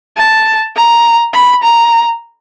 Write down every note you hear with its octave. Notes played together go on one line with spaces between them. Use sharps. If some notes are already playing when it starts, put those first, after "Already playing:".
A5
A#5
B5
A#5